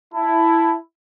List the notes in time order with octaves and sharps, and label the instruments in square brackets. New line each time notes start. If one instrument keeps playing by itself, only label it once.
[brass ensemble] E4 [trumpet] A5